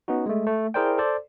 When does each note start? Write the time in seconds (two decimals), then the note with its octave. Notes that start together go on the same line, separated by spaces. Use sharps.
0.08 B3 C#4 D#4 F#4
0.26 G#3 A3
0.47 A3
0.74 E4 G#4 A#4 C5 D5 G5
0.98 A4 C5 D5